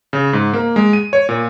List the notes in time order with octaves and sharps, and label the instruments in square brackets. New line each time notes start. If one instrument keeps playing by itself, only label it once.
[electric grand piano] C#3
G#2
A#3
G#3
D#7
C#5
A#2